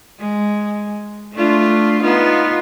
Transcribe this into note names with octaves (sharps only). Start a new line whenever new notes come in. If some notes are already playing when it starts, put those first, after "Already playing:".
G#3
A3 D4 F4
B3 D#4 F4